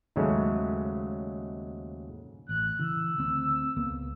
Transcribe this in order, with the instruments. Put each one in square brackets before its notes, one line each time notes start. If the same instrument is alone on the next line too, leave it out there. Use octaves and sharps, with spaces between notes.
[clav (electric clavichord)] D#2 G#2 C#3 F#3 G#3 A3
[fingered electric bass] A1 [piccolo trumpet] F#6
[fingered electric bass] C#3 E3 [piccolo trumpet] E6
[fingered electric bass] D2 C4
C#2 A#3 B3